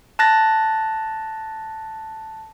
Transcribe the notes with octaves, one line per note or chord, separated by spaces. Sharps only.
A5 F#6 A6 A#6